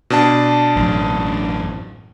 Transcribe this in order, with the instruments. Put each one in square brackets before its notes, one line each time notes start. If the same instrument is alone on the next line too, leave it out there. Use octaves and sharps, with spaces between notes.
[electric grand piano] B2 D4 A5
[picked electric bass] A1 F#2